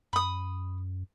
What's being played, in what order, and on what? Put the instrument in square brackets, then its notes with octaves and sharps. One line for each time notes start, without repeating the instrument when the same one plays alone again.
[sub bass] F#2 [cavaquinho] B5 D#6